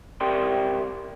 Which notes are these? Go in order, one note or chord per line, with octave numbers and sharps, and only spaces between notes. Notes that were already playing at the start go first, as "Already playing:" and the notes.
C3 G4 A#4 D5 G5 C6